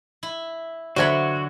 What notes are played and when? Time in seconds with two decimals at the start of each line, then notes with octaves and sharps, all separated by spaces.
0.23 E4
0.96 D3 F#3 F#4 C5 E5 B5 G#6